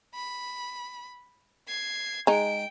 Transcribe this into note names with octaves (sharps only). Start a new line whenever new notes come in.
B5
G#6 C7
G#3 D#4 G5 D7